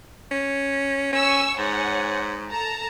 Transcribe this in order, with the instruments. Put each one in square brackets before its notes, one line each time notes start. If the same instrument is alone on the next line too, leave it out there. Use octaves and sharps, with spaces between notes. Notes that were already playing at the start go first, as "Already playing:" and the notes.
[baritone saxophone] C#4
[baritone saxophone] C#4 [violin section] G#5 C#6 E6
[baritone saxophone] G#2 [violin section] C#5 F#5 G#5
[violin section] A4 A5 A#5